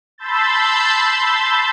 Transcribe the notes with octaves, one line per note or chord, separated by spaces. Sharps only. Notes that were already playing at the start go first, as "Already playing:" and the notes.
A5 B5 C6 E6 G6 A6